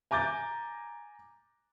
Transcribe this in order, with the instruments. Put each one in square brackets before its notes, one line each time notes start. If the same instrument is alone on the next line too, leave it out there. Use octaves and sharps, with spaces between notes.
[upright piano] G#5 A#5 D6 G6 A6